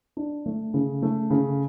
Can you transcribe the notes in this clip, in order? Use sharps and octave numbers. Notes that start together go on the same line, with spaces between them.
D4
A3
C#3
A3
C#3